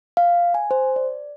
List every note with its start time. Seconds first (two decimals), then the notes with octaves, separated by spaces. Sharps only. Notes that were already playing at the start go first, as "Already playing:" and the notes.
0.17 F5
0.54 G#5
0.71 C5
0.96 D5